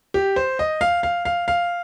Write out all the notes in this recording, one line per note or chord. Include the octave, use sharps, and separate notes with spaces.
G4
C5
D#5
F5
F5
F5
F5